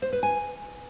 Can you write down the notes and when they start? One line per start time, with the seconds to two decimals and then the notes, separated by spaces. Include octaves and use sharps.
0.02 C5
0.12 B4
0.23 G#5